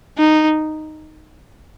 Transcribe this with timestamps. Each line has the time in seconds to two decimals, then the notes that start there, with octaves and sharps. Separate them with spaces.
0.18 D#4